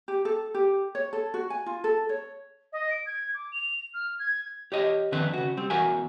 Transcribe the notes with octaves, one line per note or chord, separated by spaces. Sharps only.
G4
A4
G4
C#5
A4
F#4
G#5
F4
A4
C#5
D#5
D7
G#6
D6
F7
F6
G#6
G4 C#5 D#5 E5
F2 D3 D#3 C4 B4 E5
C#3 F#4
G3 C4
E2 F#4 A#4 E5 F#5 G#5